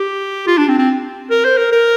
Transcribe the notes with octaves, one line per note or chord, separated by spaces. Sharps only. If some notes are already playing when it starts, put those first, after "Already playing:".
Already playing: G4
F4
D4
C4
C4
A#4
C5
A#4
A#4